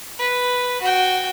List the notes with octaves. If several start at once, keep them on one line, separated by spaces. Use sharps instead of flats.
B4
F#4 G5